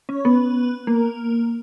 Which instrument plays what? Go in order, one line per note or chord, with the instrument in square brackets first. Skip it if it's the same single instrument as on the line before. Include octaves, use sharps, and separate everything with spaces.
[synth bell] C#4
B3
A#3